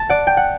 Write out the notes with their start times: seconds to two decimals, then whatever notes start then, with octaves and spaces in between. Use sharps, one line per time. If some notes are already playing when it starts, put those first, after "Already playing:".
Already playing: A5
0.09 D5 F#5
0.27 G5
0.37 F#5